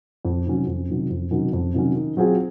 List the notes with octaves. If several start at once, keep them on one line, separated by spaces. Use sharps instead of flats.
F2
C3 D#3 F#3 C#4
F2
C3 D#3 F#3 C#4
F2
C3 D#3 F#3 C#4
F2
C3 D#3 F#3 C#4
D#3
F#3 C4 F4 G#4